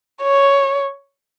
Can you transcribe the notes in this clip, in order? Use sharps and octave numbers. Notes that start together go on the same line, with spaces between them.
C#5